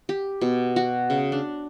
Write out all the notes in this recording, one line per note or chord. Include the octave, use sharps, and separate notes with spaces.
G4
B2
F#4
C#3
D4